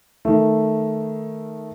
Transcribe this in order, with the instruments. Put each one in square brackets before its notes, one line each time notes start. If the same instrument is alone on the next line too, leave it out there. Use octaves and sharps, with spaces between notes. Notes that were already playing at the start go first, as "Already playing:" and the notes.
[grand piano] D#3 A3